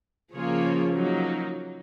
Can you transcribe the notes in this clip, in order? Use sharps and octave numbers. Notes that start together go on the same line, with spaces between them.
C#3 F3 A#3 F4 G#4 C#5
F#3 A#3 D#4